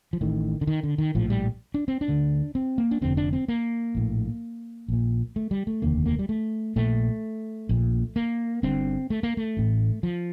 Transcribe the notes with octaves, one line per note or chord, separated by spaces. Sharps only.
F3
A1 A2 D#3
D3
D#3
D3
D#3
A#1 A2 F3
G3
D4
C4
D4
D2 D3
C4
A#3
D4
F1 F2 D3 C4
D4
C4
A#3
A#1 A2
A#1 A#2
A3
G3
A3
F1 D#2 D3 A#3
A#3
G3
A3
A#1 A#2 A3
A#1 A#2
A#3
G1 G2 D3 C4
A3
A#3
A3
A1 A2
F3